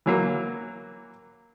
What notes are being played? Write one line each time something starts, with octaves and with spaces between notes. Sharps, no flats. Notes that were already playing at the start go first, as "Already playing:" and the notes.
E3 F#3 A#3